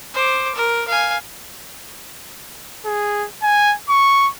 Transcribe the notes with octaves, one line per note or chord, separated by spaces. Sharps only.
C5 D6
A#4
F5 G#5
G#4
G#5
C#6